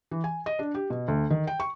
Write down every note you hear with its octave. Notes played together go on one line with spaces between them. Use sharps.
E3
G#5
D#5
D4
G4
B2
D2
D#3
G5
C#6